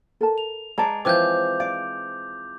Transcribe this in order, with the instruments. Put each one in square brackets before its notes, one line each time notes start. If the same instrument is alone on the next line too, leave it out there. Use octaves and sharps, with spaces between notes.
[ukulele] A4 A#4 A5
[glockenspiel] F7
[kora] G#3 D5 [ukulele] B4 A5 A#5
[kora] E3 F3 C4 [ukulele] C#5 [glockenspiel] D6 F#6 G6
[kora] D5 [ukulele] F5